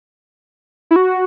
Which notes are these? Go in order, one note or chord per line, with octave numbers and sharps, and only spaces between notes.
E4
F#4